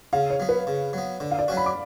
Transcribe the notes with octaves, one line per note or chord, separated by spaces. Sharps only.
C#3 F5
C#5
F#3 B3
B4
C#3
F#3 B3
D3
F5
D5
F#3 C#4 F#4
B5
D6